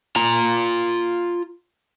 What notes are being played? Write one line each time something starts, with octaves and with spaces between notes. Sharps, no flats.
F4 A#5